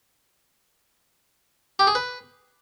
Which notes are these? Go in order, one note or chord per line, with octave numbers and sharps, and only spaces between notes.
G4
G#4
B4